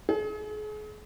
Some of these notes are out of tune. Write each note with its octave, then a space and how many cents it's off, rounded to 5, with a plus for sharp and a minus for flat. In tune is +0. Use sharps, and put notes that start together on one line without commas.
G#4 +35